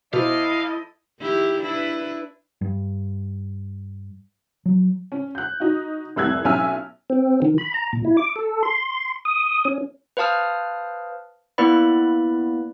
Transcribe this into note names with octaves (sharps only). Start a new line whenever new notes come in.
B2 E4 A4 C5 D#5 F5 D6
D#3 E4 G4
D4 E4 B4
G2
F#3
C#4
F#6 G6
D#4 F#4
F1 C2 E6 F#6 G#6
B1 C#4 E5 G#5 E6 F6
C4
D#3
B5
A#5
A#2
E4
D6
A4
C6
D#6
C#4
B4 C5 F5 A5 D#6 F6
A#3 B3 E4 B4 D5 B5